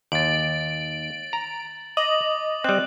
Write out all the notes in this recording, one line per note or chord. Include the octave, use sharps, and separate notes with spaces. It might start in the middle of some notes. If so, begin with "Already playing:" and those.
D#2 A6 D7 F#7
A#5
D#5 D6 F#7
G3 C4 F#6